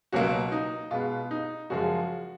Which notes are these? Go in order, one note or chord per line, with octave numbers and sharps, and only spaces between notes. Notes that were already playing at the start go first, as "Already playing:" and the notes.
C#2 B2 F#3 A#3 F#4
D#4
B2 G#3 B3 F4
D#4
F#2 C#3 F3 G#3 F#4